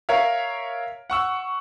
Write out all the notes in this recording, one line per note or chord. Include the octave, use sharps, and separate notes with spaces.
A#4 C#5 E5 F5
F#5 C#6 E6